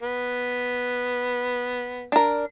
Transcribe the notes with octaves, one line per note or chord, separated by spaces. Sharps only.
B3
D4 A#4